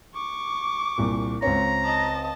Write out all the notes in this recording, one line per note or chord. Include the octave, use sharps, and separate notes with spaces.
C#6 D6
C2 A#2
C#2 C4 C#5 A#5
D#5 A5